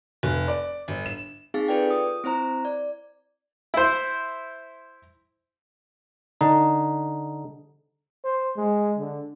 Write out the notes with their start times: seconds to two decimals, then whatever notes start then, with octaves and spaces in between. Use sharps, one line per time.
0.23 F1
0.48 D5
0.88 G1
1.06 E7
1.54 C4 D#4 G#4 F5
1.68 F4 A4 B4 D5 G5
1.90 D#6
2.24 C4 E4 C5 A#5
2.65 D5
3.74 E4 C5
6.41 D3 D#4
8.25 C5
8.57 G#3
8.99 D3